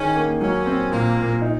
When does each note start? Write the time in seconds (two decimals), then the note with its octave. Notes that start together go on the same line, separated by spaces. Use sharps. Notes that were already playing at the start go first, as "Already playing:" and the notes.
Already playing: D#3 C#4 G#4
0.16 A#3
0.41 F#3 C#4
0.66 C4
0.91 A#2 A#3
1.16 A#2
1.42 D#4